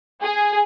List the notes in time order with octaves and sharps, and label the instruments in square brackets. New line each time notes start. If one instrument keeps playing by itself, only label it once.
[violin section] G#4